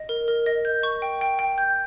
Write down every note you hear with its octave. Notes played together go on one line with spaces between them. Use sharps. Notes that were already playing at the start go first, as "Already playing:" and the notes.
Already playing: D#5
A#4
A#4
D#5
G6
C#6
G5
G5
G5
G6